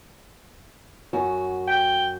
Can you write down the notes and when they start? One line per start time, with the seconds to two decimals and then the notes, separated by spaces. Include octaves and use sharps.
1.13 F#2 F#4
1.68 G5